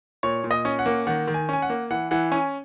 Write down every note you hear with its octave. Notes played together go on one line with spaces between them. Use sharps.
A#2 C#5
A#2
D#5
C#4
F#5
A#3
D#3 F#5
D#3
G#5
C#4 G#5
F#5
A#3
E3 F#5
E3 F#5
C#4 G#5